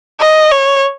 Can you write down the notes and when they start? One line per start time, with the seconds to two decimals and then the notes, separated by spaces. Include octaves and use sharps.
0.20 D#5
0.51 C#5